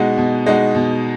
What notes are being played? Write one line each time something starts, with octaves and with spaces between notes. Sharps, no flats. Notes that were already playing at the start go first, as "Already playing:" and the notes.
Already playing: B2 G#3 D#4 F#4
B2
G#3 D#4 F#4
B2